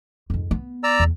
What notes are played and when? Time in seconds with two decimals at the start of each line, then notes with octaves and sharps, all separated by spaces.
0.30 F2 G#2
0.51 B3
0.84 D5 A#5 E6
1.00 E2